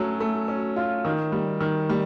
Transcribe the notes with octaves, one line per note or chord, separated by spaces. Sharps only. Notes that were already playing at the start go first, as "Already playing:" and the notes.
Already playing: F#3 A3 C#4
A3
C#4
F4
D#3
G3
D#3
G3